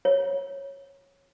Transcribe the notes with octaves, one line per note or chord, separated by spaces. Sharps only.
C#5